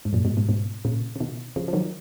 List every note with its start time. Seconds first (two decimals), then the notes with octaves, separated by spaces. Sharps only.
0.05 G#2
0.13 F#2 A#2
0.25 G#2 B2
0.37 G#2 B2
0.49 G#2 B2
0.85 A#2 C#3
1.16 C#3
1.20 B2 D#3
1.56 C#3 F3
1.68 F3
1.73 D#3 F#3